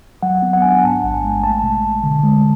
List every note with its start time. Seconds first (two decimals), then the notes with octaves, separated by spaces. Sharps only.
0.23 F#3 F#5
0.42 B3
0.53 F#5
0.62 D4 G#5
0.71 F#5
0.84 G#2 A5
1.04 A1
1.14 G#5
1.24 G#3
1.44 A3 A5
1.64 B2
1.84 B2
2.04 D3
2.24 G#3